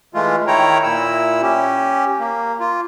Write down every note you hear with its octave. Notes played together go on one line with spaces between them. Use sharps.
E3 G#3 A3 F4
D#3 E4 C#5 G5 A#5
A#2 E4 E6
C#4 G4
A#3
F4